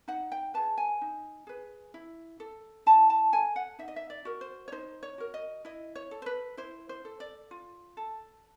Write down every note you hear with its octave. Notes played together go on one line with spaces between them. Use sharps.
D#4 F#5
G5
G#4 B4 A5
G#5
D#4
G#4 B4
E4
A4
E4 A5
A5
A4 G#5
F#5
D#4 E5
D#5
E5
D5
F#4 A#4
C5
C#5
D#4 C5
C#5
F#4 A#4
D#5
E4 D#5
C#5
A4
C5
B4
E4 C5
C5
A4
D5
F4
A4